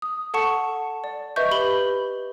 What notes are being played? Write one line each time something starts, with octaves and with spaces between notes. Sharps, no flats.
D#6
A4 F#5 A5 C#6 C#7
D5
B4 D#5 E5 C#6 G6
G4 B5 F#7 G7